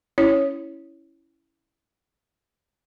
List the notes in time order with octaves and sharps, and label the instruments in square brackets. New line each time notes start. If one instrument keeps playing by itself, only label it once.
[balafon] C#4 E4 C#5